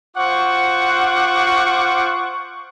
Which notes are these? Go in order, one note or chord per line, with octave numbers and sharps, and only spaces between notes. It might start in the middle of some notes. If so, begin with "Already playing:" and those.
F4 C5 F#5 C#6 D6